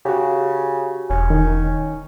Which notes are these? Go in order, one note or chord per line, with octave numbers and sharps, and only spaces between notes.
C#3 F#4 G4
E1 C#4
D#3 D#4